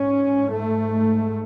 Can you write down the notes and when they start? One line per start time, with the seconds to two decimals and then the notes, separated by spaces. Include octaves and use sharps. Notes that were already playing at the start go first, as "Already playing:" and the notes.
Already playing: G#2 C#4
0.52 A3